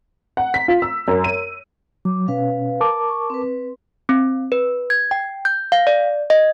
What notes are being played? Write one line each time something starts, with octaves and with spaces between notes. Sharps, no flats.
F#5
B6
F4
E6
F#2
D#7
F#3 D6
B2 C#4 B4 F5
A#4 A5 D6
C#6
C4 B4
C4
B4
G#6
G5
G6
F5
D5
D#5